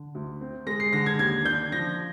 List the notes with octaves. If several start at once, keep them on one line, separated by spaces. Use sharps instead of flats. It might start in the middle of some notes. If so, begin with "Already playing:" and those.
Already playing: D3
D2
C4
G#3 A#6
C7
D3 A#6
G#6
D#2 G#6
D4 G6
F3 A#6